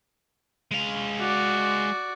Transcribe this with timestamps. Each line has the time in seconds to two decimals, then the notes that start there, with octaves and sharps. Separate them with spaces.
0.71 G#3 F5
1.19 F#4 D5